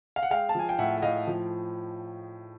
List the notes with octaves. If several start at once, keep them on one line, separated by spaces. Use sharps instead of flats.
F5
F#5
G#3 F5 G5
A5
F3 G#5
G5
A2 E5 F#5
F#5
A2 D#5 F5
F3